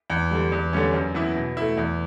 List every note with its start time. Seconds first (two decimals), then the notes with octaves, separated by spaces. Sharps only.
0.10 E2
0.31 D3 G3
0.52 E2
0.73 D3 G3 C#4
0.94 F#2
1.14 E3 B3 E4
1.36 B2
1.57 A3 E4
1.77 E2